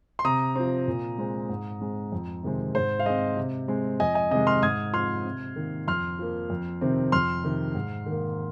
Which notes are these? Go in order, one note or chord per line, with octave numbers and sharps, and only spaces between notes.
C6
C3 A#5 D#6
F3 C4
A#2
G#3 C4
G#2
G#3 C4
F2
C3 D#3 G#3 C4
G#2 C5
F5
G#3 C4 D#5
C3
G#3 C4
F2 D#5 G#5
D#5 G#5
C3 D#3 G#3 D#5
C6 F6
G#2 D#6 G#6
F3 C4 C6 F6
C3
D#3 A#3
F2 C6 F6
F3 A#3
F2
C3 D#3 C4
F2 C6 F6
C3 D#3
G#2
D#3 A#3